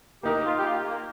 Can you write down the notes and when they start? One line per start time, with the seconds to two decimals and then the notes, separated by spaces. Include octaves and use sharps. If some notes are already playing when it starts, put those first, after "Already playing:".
0.23 A#3 D#4 G4 A#4
0.44 F4
0.58 G4
0.64 F4
0.84 A#3